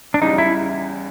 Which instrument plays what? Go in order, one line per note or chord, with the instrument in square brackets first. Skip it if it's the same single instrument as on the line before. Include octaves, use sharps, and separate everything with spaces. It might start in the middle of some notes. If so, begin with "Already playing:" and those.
[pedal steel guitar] D4
[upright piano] E2 C#3 E3 G3 [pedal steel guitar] D#4
[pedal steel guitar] E4